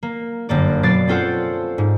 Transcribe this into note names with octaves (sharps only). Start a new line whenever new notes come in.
A#3
G1 F#2 A#3 D5
B2 F#3 D5 A6 C7
C4 C#4 F4 A4 C5 F#5
G#2